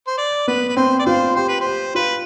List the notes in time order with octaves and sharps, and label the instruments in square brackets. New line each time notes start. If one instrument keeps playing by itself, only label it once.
[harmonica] C5
D5
[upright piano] B3 [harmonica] B4
[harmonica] B4
[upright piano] C4 [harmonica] C5
[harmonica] D5
[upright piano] F4 [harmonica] C5
[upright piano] G4 [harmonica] C5
[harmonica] B4
C5
[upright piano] G4
[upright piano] F4 [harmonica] B4